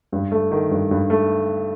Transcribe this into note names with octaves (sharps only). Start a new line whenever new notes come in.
G2
A3
D#3
G2
G2
A3